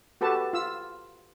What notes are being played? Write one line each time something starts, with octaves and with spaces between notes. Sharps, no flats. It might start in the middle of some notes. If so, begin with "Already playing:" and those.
F#4 G4 A4 B4 A5
F4 E6